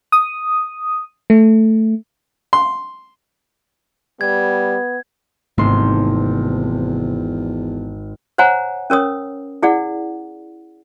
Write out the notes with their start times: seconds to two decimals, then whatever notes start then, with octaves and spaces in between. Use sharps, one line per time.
0.12 D#6
1.30 A3
2.53 C6
4.21 G3 B3 G#6
5.58 G#1 E2 C3 A3 C4 C6
8.38 C5 C#5 F#5 G#5 A#5
8.90 C#4 A#4 C#5 D#6
9.63 E4 G#4 D5 F#5